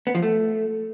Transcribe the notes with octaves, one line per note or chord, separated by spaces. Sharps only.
B3
F3
A3